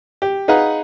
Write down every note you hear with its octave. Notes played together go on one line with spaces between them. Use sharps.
G4
D#4 G#4 B4 F5 F#5 A#5